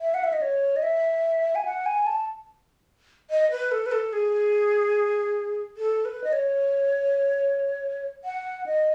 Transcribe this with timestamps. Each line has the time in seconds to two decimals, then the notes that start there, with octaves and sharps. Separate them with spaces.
0.01 E5
0.14 F#5
0.24 E5
0.33 D#5
0.42 C#5
0.76 D#5
0.83 E5
1.55 G#5
1.65 F#5
1.86 G#5
2.06 A5
3.30 D#5
3.51 B4
3.71 A4
3.86 B4
3.92 A4
4.13 G#4
5.77 A4
6.05 B4
6.24 D#5
6.33 C#5
8.25 F#5
8.66 D#5